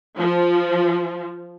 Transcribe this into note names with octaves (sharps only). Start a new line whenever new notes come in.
F3